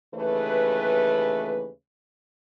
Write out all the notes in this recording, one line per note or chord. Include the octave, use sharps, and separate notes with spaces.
D#2 C#3 E3 A3 B4